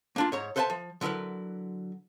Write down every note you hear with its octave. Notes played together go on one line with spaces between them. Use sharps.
A#3 D4 F4
G#2 C#5 A#5
A4 B4 C5 E5 F#5 A5
F3
D3 F#3 E4 A#4 B4